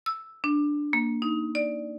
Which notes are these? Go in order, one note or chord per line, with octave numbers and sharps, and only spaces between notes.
E6
D4
A#3
D#4
D5